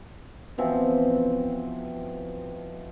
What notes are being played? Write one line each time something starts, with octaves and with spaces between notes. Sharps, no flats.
B2 E3 F3 C4